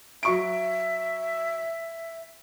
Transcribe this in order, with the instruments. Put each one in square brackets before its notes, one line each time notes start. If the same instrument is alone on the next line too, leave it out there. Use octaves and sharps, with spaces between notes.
[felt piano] F#3 C#6 D7 [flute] E5